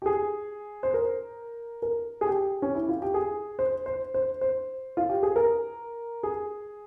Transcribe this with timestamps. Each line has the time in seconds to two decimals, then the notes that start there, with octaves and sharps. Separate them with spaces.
0.02 G4
0.06 G#4
0.83 C5
0.94 A#4
1.82 A#4
2.21 G#4
2.27 G4
2.62 C#4
2.75 E4
2.89 F4
3.02 G4
3.14 G#4
3.59 C5
3.86 C5
4.14 C5
4.41 C5
4.97 F4
5.09 G4
5.23 G#4
5.36 A#4
6.23 G#4